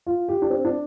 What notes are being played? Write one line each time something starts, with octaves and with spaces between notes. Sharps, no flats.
F4
G4
D4
C4
D4